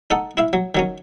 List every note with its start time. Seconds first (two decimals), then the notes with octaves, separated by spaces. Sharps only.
0.10 D#4 A4 F#5
0.37 E4 E5 F5
0.53 F#3
0.75 D#3 F#3 C#4